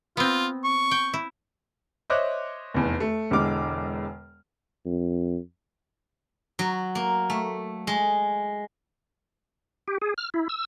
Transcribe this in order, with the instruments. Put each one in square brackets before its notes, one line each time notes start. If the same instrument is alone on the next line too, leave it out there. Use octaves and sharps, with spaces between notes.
[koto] B3 C4 [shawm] F4
[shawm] C#6
[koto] G5
E4
[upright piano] C5 C#5 D#5 E5 D6 F#6
F1 E2
A3
E1 E2 D3 G#3 D6 F6
[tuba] F2
[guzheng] F#3
A#3
A3
G#3
[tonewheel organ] G4
G#4
F6
E4
E6